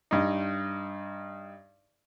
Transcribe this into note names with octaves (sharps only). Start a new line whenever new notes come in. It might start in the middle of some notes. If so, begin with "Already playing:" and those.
G2 D#4